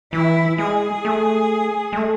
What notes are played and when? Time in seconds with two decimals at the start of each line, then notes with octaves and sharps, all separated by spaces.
0.13 E3 E4
0.58 G#3 G#4
1.05 A3
1.93 G#3
1.97 A3